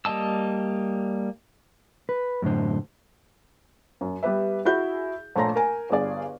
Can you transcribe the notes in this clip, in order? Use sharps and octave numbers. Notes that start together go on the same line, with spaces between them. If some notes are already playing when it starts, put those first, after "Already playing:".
G3 A#3 D#5 A5 E6
B4
F#2 A2 D3 C5
F#2
G3 B3 G4 B4 E5
E4 F#4 G#4 E5 G6
A#1 A3 C#5 A#5 C6 A#6
A#4 G#5
G1 G2 G#4 D5